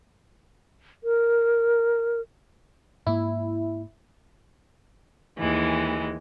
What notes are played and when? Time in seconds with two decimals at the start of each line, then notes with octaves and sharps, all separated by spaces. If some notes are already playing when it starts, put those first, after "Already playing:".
1.04 A#4
3.07 G#2 A#3 E4
5.37 D#2 E3 G#3